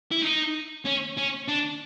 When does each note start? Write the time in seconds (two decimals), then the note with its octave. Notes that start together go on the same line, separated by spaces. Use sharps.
0.11 E4
0.22 D#4
0.85 C#4
1.17 C#4
1.48 D4